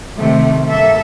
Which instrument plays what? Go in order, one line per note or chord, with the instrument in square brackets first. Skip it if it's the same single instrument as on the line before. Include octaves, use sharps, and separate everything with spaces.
[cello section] C3 D#3 A3
G2 A#3 A4 E5